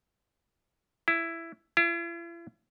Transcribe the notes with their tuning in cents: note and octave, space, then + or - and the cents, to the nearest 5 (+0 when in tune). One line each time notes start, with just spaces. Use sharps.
E4 +10
E4 +45